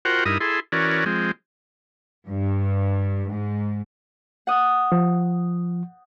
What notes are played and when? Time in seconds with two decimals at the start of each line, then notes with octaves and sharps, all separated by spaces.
0.05 F4 F#4 A#4 C5 F#5 G5
0.25 G2 D#4 E4 A#4 D#6
0.41 E4 G#4 A4 C6
0.72 E3 C#4 F#4 A#4 D5
1.06 F3 G#3 C4
2.29 G2
3.32 G#2
4.47 F#5 D#6
4.92 F3